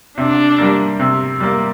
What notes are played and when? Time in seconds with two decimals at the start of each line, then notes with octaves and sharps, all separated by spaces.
0.18 C3 D4
0.58 G3 A#3
1.00 C3
1.40 G3 A#3